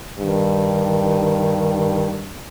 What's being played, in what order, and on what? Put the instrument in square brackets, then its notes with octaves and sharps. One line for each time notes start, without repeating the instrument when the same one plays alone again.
[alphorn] G2 [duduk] D#3